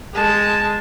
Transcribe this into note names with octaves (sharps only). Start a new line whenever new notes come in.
G#3 A5